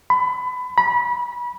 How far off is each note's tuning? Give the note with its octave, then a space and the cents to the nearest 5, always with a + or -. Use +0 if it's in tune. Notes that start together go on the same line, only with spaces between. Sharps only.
B5 +25
B5 -25